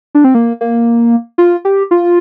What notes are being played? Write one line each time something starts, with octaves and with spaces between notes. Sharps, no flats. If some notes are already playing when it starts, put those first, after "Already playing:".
D4
C4
A#3
A#3
F4
G4
F4